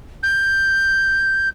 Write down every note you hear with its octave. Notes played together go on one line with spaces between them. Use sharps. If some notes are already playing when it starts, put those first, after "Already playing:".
G6